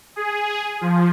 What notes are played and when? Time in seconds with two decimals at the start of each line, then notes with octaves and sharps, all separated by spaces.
0.16 G#4
0.81 F3